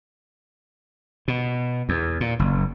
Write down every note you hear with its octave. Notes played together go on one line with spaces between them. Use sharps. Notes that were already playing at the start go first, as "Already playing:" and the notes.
B2
E2
A#2
F#1